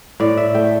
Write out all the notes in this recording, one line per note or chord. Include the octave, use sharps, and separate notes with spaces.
A2 D5
E5
A3 G5